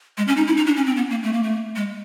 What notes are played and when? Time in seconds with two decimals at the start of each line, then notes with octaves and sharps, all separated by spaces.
0.17 G#3
0.27 C#4
0.37 D#4
0.47 E4
0.57 D#4
0.66 D4
0.76 C#4
0.86 C4
0.97 B3
1.10 A#3
1.23 A3
1.33 A#3
1.43 A3
1.76 G#3